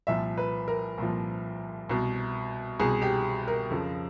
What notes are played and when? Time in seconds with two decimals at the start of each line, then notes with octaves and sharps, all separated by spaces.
0.07 C2 A#2 F3 E5
0.38 B4
0.68 A#4
0.98 C2 A#2 F3
1.89 C2 B2
2.80 C2 B2 G#4
3.02 G4
3.48 A#4
3.70 F2 C#3 F3